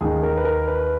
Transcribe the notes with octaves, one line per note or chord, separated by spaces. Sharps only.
D#2 D#3 G#4
A#4
B4
A#4
B4